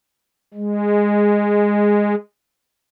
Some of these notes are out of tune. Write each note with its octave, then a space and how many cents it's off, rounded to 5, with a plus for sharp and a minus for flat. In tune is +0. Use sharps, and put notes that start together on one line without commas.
G#3 -10